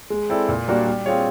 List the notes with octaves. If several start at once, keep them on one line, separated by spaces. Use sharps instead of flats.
G#3
C4 E4 A4 D5
A#2
G3 A#3 D4 F#4
G3
C4 F4 G#4 C#5